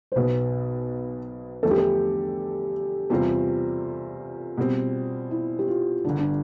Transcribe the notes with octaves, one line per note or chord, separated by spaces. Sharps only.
C5
B1 B2 B3 B4
E2 D3 F3 A3 D4 A4
G4
A4
E2 C3 G3 C4 F4
B2 G3 C4
E4
G4
F4
G1 G2 D3 D4
D4